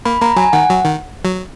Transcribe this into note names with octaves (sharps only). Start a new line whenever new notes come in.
A#3 B5
A#3 A#5
F#3 G#5
D#3 F#5
F#3
D#3
F#3